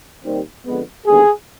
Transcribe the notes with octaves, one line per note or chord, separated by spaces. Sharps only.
D#2 D#3 G3 C4
F2 D3 G#3 B3
D#2 D3 G3 B3 G#4